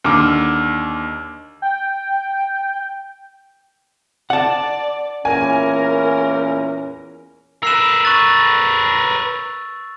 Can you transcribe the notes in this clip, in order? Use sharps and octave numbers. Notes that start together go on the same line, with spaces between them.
D#2 D3 D6 F6
G5
D5 F#5 A5
E2 A#2 C#4 A#4 G#5
A#4 B4 E6 C7 E7
C#6 F#6 A6